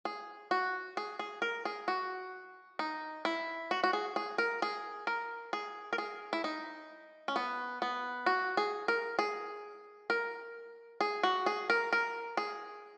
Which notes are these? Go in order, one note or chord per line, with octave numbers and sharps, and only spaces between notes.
G#4
F#4
G#4
G#4
A#4
G#4
F#4
D#4
E4
F#4
F#4
G#4
G#4
A#4
G#4
A#4
G#4
A#4
G#4
E4
D#4
C#4
B3
B3
F#4
G#4
A#4
G#4
A#4
G#4
F#4
G#4
A#4
A#4
G#4